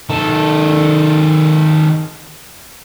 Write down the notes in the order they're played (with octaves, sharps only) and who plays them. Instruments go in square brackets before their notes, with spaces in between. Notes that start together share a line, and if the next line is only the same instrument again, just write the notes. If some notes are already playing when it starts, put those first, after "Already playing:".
[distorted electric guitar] D#3 A4